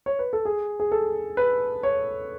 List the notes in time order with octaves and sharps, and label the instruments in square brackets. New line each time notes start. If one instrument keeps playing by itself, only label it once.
[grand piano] C#5
B4
A4
G#4
G#4
A4
B4
C#5